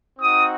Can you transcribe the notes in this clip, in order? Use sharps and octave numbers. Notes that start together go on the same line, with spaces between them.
C4 D#4 F#4 D#6